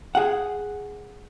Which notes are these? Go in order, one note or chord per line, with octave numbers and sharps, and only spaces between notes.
G#4 F#5